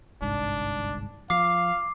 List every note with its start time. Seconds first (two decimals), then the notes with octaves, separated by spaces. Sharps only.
0.22 G1 C2 G#2 D4
1.30 F3 F5 D6 C7